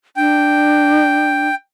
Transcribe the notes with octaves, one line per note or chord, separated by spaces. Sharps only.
D4 G5